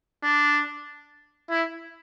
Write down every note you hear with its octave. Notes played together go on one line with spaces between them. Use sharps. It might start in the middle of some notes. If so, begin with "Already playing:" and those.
D4
E4